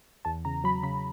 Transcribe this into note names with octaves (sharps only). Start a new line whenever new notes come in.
E2 A5
C#3 A#5
F#3 B5
C#3 B5